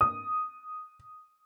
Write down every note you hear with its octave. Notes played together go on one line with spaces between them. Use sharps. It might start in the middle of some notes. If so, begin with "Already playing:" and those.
D#6